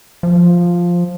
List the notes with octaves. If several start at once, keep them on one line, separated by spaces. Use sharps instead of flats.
F3